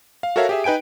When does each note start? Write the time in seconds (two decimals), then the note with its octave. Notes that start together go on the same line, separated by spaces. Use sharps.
0.23 F5
0.36 F#4 A4 A#4 C#5 E5 F5
0.49 G4 G#4 E5
0.64 D#4 B4 G5 G#5 D7